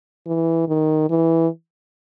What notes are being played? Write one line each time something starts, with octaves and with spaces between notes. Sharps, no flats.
E3
D#3
E3